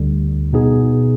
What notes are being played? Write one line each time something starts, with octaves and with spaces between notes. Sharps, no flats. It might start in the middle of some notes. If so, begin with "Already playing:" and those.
Already playing: D2 D3 G3
B2 B3 D#4 G#4